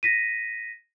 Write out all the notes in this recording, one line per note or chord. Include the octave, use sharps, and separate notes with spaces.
A#6 B6 D#7